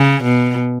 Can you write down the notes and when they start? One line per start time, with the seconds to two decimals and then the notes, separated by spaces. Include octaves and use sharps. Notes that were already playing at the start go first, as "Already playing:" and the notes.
Already playing: C#3
0.24 B2